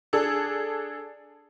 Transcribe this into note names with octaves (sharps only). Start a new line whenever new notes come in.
D4 G#4 A4